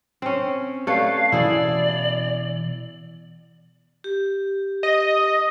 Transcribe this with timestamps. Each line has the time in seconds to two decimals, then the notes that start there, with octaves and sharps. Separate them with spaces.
0.22 C4 C#4
0.87 A3 G4 B4 C#5 D5 F5
1.32 B2 E3 E4 G#4 D5
4.04 G4
4.83 D#5